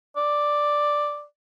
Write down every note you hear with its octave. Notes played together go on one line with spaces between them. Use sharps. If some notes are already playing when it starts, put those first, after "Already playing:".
D5